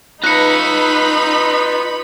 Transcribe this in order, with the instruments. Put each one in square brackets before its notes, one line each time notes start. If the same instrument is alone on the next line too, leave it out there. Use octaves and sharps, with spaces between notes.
[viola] D#4 [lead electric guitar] F4 D#5 [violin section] B4 B5 [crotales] F#6 C#7